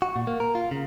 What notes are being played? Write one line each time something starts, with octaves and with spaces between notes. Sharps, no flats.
F#4
A#2
A#3
A#4
F4
C#3